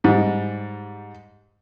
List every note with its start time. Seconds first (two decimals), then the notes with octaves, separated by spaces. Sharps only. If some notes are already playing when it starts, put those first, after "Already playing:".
0.04 G#2 G3